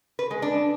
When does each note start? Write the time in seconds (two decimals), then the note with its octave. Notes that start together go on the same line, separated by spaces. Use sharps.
0.19 B4
0.31 G#3
0.42 D4